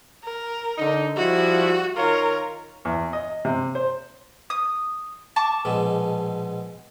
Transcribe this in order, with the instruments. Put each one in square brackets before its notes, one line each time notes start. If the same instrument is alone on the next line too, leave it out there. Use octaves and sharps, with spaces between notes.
[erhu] A#4
[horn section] D3 D#4
[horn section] F3 G3 E4 [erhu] F#4
[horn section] D#3 F4 C#5 [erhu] A#4
[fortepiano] E2
D#5
C3
C5
[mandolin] D#6
A5 C#6 D6
[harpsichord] A#1 B2 G#3